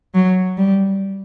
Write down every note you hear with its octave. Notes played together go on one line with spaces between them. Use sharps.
F#3
G3